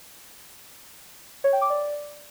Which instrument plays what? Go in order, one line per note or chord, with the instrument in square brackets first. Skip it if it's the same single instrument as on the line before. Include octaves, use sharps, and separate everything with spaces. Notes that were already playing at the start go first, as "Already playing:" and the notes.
[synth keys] C#5
G5
D6
D5